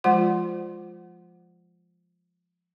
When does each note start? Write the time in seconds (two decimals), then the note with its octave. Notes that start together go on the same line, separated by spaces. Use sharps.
0.04 F3 G#3 F4 C5 F#5 C6